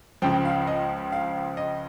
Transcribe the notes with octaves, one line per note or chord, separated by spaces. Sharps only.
C#2 C#3 F3 G5
F5
D#5
F5
D#5